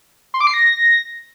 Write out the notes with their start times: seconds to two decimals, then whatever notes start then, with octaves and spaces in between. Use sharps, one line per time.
0.34 C6
0.40 D6
0.47 C7
0.54 A#6